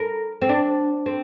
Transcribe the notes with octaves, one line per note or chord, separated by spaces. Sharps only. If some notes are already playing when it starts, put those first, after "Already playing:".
Already playing: A#4
C4
D4
C4